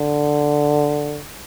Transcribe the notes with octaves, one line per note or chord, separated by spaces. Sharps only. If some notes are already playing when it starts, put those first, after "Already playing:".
Already playing: D3